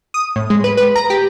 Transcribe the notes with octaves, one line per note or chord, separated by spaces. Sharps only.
D#6
A2
G#3
B4
B4
A#5
G4